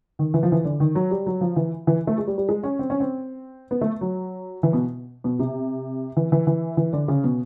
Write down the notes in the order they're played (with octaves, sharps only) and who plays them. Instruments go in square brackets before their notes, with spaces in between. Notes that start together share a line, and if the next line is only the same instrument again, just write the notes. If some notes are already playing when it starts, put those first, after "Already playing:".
[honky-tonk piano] D#3
E3
F3
E3
D3
D#3
F#3
G3
F#3
F3
E3
E3
A3
G#3
G3
G3
G#3
C#4
C4
C#4
C4
B3
A3
F#3
E3
B2
B2
C3
E3
E3
E3
E3
D3
C#3
B2